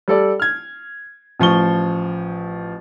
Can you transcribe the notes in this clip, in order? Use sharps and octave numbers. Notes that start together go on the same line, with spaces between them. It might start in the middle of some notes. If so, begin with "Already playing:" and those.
G3 A4 D5
F6 G#6
A1 F3 C#6 G7